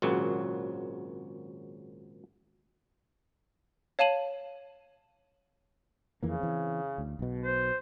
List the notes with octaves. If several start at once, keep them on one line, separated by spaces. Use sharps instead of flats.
G#1 A#2 C#3 F#3
C#5 F5 A5 D#7 F#7
F2 C#3 E3 A#3
E3 C4
D2
B1 B2
C5